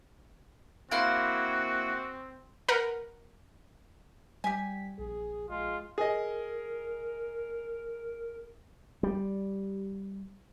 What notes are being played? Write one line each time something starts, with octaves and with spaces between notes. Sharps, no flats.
A#3 C4 E4 F#4 C6
A#4 B4 F#5
G3 G4 G5 G#5 B6
A#1 G#4
G#3 F4
G#4 A#4 D#5
G3